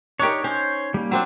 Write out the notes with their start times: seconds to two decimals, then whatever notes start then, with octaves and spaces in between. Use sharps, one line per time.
0.20 D4 D#4 G4 A#4 C#5
0.44 C#4 C5 C#5
0.94 G3 A#3
1.11 F#3 C4 D4